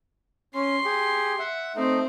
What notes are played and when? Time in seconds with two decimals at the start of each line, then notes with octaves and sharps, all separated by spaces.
0.54 C#4 C6
0.85 G4 G#4
1.39 E5 F#5
1.75 A3 C4 D#4 C5